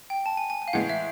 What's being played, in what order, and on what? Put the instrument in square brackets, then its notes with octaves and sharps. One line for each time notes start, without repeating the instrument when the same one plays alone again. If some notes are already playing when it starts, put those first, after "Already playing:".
[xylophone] G5
A5
G#5
G#5
G#5
F5
[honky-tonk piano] A2 E3 G#3 [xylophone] F#5
[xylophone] E5